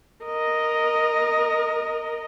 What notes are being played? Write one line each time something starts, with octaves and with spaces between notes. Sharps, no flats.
A#4 D#5